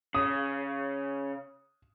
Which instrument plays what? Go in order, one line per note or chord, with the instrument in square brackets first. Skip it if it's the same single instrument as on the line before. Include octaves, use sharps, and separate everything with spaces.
[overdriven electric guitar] C#3 [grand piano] D#6